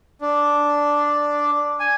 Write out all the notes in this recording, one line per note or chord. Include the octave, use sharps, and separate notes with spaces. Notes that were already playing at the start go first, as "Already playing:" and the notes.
D4
G#5